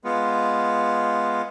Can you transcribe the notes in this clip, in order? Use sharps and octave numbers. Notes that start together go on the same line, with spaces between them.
G#3 B3 F4